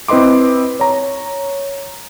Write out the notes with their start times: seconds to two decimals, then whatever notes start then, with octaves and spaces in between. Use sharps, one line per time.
0.08 C4 E4 B4 D#5 C6 D6
0.80 C#5 A#5